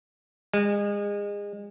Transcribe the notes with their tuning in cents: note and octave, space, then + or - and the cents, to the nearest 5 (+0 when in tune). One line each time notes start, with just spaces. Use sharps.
G#3 -30